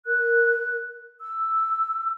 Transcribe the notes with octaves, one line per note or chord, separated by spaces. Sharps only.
A#4 F#6
E6